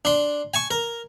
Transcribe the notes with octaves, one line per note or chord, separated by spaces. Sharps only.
D4 C6
G#5 A5 C#6
A#4